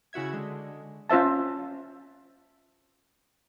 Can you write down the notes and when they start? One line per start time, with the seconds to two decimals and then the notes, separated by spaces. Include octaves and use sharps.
0.13 C#3 E4 F#4 E5 G#6
0.33 D3 G#3
1.10 C#4 F4 C5 E5 A5